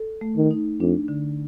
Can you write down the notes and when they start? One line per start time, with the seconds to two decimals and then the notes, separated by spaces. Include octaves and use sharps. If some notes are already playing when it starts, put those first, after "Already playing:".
Already playing: A4
0.21 A3
0.36 D#3
0.51 D#4
0.80 F2 D4
1.08 D3